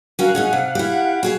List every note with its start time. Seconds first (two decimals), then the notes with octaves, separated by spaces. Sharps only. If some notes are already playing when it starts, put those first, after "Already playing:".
0.19 C#4 F#4 A#4 F5 F#5
0.35 C#4 D#4 G#4
0.53 C3
0.75 E4 G4
1.23 F#4 G#4 F5